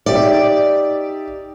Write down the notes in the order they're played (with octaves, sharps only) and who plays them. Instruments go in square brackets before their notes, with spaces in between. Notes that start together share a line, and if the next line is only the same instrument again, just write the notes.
[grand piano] D#4 G4 E5 [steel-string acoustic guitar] D5